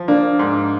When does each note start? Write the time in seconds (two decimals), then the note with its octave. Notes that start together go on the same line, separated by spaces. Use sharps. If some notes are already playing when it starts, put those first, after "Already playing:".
Already playing: F3
0.08 A#3 D4
0.39 G#2